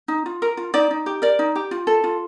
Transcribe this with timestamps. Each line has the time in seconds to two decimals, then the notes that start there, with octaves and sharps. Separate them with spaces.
0.08 D#4
0.26 F4
0.42 A#4
0.57 F4
0.74 D#4 D5
0.91 D#4
1.06 G4
1.22 A#4 D5
1.39 D#4
1.56 G4
1.71 F4
1.87 A4
2.04 F4